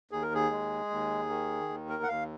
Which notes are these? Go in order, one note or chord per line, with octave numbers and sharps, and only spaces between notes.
D#2 G#4
A#4
G#4
G#3
D#2
D#3
D#2
A#4
F#5
D#2 F5